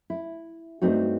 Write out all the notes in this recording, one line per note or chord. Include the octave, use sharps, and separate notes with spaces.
E4
G2 A3 C4 D#4 F#4